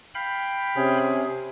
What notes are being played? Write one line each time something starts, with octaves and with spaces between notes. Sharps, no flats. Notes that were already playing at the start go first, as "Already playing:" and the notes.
F5 G5 B5
C3 C#4 G#4